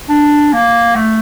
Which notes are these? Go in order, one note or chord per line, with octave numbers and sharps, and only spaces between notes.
D4
A#3
A3